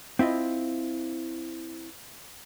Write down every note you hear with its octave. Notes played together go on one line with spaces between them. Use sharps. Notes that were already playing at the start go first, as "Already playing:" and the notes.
C4 E4 F4 D#5